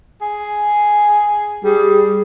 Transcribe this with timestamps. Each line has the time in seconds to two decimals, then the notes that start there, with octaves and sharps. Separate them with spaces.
0.22 G#4
1.64 G3 G#4